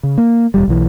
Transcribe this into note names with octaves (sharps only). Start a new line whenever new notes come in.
C#3
A#3
D#1 G#1 G3
B1 E3